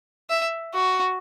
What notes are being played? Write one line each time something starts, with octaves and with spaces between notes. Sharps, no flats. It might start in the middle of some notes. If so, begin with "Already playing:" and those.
E5
F#4